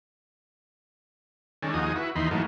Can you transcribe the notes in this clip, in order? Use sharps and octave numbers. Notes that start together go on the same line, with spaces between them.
D#3 G#3 C#4 D4 A4
D#2 F3 D#4 F#4 G#4 D#6
E4 F#4 B4
D#2 E3 D#4 B5 C6
G#2 E3 F#3 A3 A#3 D#4